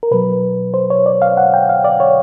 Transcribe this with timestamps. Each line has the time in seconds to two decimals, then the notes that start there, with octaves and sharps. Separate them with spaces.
0.03 A#4
0.11 B2 F#3 B4
0.74 C5
0.90 C#5
1.06 D5
1.22 F5
1.37 F#5
1.54 G5
1.69 F5
1.84 D5
2.00 C#5